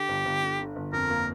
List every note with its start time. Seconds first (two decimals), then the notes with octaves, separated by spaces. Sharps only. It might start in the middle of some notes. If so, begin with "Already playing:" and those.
Already playing: D3 G4
0.09 G1
0.25 G1
0.42 D3
0.59 D3
0.76 G1
0.93 F2 A#4
1.10 A#3